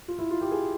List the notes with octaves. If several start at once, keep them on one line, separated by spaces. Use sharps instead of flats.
F4
E4
F4
G4
G#4